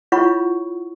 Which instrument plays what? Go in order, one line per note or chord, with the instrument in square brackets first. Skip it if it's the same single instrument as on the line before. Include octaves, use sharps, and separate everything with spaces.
[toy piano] E4 F4 C#5 F#5 B5 C#6